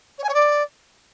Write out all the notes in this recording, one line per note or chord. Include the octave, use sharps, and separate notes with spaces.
C#5
G#5
C#5
D5